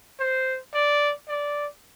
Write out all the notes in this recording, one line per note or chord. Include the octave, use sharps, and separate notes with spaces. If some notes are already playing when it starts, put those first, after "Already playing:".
C5
D5
D5